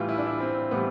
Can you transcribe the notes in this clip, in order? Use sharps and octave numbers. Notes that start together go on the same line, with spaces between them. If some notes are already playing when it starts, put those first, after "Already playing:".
Already playing: A2 E3 G3 F4
E4
D4
E4
C4
A2 E3 G3 B3